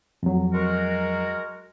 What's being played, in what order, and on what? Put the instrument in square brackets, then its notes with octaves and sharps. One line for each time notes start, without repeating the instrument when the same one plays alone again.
[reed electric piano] F2 F#3
[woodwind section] G#3 F#4 A#4